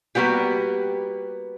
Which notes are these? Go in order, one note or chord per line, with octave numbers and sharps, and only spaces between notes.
G3 A#3 B3 F#4 G4